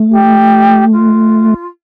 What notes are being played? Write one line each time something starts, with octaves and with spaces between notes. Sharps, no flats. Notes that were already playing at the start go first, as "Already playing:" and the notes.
Already playing: A3
G4
F4